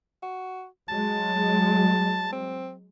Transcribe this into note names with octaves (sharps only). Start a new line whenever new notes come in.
F#4
F#3 G#3 A5
C4